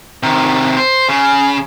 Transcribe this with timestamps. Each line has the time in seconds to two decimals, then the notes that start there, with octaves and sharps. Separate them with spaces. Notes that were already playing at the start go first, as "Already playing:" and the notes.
0.23 C3 D#3
0.77 C5
1.09 C#3